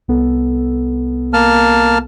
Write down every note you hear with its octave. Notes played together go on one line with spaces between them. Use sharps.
C2 B3 A4
A#3 A5 F6